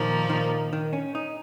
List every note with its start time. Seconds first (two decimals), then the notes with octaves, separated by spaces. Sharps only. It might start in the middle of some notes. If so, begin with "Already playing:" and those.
Already playing: A#2 D#3 F3 A#3
0.30 D#3
0.73 D#3
0.93 C#4
1.15 D#4